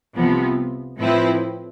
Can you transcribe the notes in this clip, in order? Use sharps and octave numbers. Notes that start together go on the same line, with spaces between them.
C2 C3 F3 B3
A2 F3 C4 E4 B4